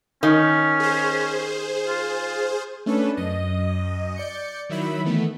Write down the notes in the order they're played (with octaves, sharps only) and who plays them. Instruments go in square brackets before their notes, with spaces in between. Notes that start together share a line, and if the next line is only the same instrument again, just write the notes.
[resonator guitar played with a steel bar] D#3 [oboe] C#4
[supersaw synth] G#4 C5
[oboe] F4
[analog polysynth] A3 C#4 D4 A4 B4
F#2 D#5
D5 G6 C#7
D#3 F#3 E4 E5 B5
D#3 E3 A3 B3